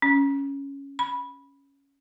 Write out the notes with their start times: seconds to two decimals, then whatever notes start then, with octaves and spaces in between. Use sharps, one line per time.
0.02 C#4
0.99 B5